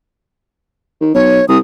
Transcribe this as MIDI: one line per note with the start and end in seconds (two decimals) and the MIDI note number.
1.01 1.10 51
1.15 1.40 35
1.15 1.45 73
1.48 1.58 36
1.48 1.58 87